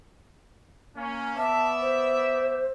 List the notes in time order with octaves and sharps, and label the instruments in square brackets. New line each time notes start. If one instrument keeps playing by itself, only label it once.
[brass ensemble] A#3 C#4
[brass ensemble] B3 D5 E5 [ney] A5
[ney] C5